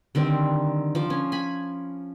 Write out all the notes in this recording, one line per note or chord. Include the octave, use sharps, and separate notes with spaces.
D3 D#3 G3 C4
F3 D6
C#4
G#5 B5